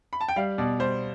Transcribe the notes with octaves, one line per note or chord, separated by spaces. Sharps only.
B5
A5
G5
G3 F5
B2 D5
G3 C5